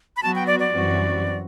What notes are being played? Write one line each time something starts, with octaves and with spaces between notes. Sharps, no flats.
B5
F#3 B3 F#4 A5
G5
D5
D5
F#2 E3 G3 C4 F#4